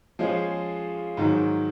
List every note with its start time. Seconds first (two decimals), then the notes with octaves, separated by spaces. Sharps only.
0.19 F3 G#3 C#4 F4 G#4
1.17 G#2 D#3 F#3